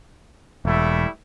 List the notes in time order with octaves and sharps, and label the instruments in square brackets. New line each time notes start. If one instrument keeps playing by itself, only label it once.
[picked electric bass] E1 [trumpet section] G3 A3 E4